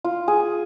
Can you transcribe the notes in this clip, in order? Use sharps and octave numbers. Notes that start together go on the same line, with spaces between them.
F4
G#4